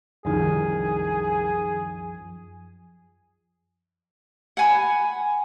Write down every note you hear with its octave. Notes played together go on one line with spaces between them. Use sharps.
C2 F#2 D#3 F3 G#4
F#5 G#5 B5